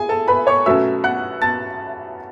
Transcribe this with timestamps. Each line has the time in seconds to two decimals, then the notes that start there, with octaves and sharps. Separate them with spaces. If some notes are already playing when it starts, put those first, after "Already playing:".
Already playing: G#4 G#5
0.09 A4 A5
0.28 B4 B5
0.47 C#5 C#6
0.66 B2 F#3 A3 C#4 E5 E6
1.04 F#5 F#6
1.42 A5 A6